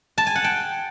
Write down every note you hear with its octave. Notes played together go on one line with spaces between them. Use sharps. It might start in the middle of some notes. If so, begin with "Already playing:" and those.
A5
G#5
F#5
G5